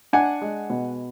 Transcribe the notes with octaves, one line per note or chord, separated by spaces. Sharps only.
D4 F#5 G#5
G#3
B2